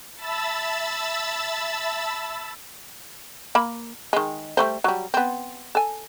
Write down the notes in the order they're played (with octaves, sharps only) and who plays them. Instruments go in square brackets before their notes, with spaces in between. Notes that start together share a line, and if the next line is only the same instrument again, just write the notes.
[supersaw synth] E5 A5 B5 E6 A6
[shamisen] A#3 B5
D#3 G#3
G3 A3 C5
F#3 G3
B3 C4
A4 G#5